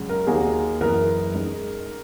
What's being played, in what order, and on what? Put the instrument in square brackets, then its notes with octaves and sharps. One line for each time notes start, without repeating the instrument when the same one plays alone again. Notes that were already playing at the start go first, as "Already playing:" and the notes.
Already playing: [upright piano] C#2 C#3 F#3 C#4
[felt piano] A#4
[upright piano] D#2 D#3 A#3 D#4 F#4 [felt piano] G#4
[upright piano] F#1 F#2 E3 B3 [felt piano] A#4
[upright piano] C#2 C#3 G#3 D#4